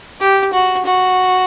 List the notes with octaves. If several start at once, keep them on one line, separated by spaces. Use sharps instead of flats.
G4
F#4
F#4